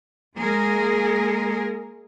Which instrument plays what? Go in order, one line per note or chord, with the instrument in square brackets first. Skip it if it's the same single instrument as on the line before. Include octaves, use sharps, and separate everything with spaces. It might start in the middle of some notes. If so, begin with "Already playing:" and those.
[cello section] G#3 A#3 G#4 A#4